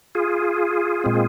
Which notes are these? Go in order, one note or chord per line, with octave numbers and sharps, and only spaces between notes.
F4 G#4
A#2 G#3 C4